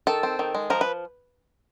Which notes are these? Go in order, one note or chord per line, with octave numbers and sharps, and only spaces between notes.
D#3 A4
C4
D#3
G#3
F3 A#4
B4